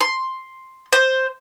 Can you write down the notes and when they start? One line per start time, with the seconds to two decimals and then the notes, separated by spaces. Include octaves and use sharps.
0.01 C6
0.93 C5